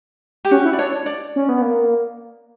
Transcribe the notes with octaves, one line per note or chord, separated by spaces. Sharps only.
G4
C#4 F#4
E4
D5
D4 C#5
D4
D5
C#4
B3
A#3